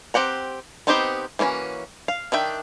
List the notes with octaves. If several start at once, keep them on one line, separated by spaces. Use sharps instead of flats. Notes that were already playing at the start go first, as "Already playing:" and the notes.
C4 G4 F#5 A#5
B3 C4 D#4 G4 C5
E3 A#3 C#4 E4 F#4
F5
D#3 D4 E5 G5